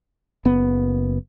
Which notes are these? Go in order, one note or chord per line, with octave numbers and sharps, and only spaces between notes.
F#1 B3